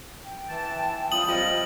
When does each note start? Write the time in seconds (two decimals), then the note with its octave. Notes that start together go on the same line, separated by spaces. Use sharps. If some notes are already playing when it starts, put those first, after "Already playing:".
0.25 G5
0.49 E3 A5
1.12 G3 C4 F4 D#6 F#7
1.29 F3 D#5 G5